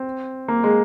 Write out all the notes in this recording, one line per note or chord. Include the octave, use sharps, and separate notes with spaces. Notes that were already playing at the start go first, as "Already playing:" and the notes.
Already playing: C4
A#3
G#3